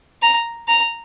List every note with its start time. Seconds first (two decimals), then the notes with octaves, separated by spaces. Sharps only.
0.22 A#5
0.68 A#5